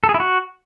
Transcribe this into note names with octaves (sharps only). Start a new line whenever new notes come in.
A4
G#4
E4
F#4